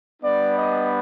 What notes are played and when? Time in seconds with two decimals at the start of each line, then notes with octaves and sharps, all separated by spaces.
0.22 G3 B3 D4 D5
0.57 D#5